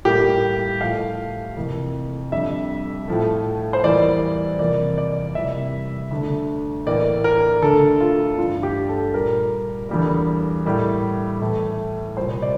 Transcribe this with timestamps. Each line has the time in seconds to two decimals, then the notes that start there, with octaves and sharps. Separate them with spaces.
0.05 A2 G3 A#3 G4
0.81 A2 F3 A3 F5
1.57 F2 C3 E3 A#3
2.32 F2 D3 G3 E5
3.08 A2 F3 A3
3.73 C5
3.84 E2 E3 G3 A#3 D5
4.59 E2 C3 F3 A#3 D5
4.98 D5
5.35 F2 C3 E3 G3 A#3 E5
6.11 D2 D3 A3
6.86 A2 E3 A#3 D5
7.24 A#4
7.62 D2 D3 A3 A4
8.00 F4
8.38 G2 E3 A3 F4
8.63 G4
8.89 A4
9.14 A#2 G3 A#3 A#4
9.89 E2 D3 G3 A#3
10.65 A2 G3 A#3
11.41 A2 E3 A3
12.17 C2 A#2 G3 C5
12.42 D5